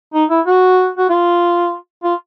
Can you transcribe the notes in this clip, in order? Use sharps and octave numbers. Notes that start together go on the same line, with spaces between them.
D#4
E4
F#4
F#4
F4
F4